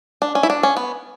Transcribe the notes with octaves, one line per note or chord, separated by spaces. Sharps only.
D4
C#4
E4
D4
C#4
B3